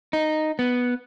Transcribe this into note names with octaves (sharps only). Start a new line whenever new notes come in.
D#4
B3